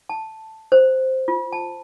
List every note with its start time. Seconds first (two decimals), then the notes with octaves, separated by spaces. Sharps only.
0.09 A5
0.72 C5
1.28 F4
1.53 A5